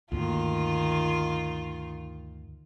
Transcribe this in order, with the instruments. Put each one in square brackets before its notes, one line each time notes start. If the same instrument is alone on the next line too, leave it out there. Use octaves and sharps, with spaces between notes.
[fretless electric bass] D2 G2 A#3 [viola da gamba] D#3 F4